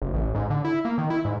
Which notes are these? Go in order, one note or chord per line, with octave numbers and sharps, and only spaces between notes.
F#1
A1
G#2
D3
E4
A#3
D#3
E4
G#2